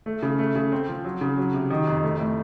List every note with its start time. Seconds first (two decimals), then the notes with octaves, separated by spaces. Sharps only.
0.06 A3
0.22 C#3
0.39 A3
0.55 C#3
0.72 C4
0.88 F3
1.04 F#3
1.21 C#3
1.38 F#3
1.54 C3
1.70 D#3
1.87 F2
2.03 A3
2.20 A2